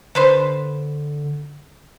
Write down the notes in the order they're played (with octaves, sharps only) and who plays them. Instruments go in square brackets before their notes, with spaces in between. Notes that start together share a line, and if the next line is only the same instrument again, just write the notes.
[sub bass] D3 [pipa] D4 B4 C5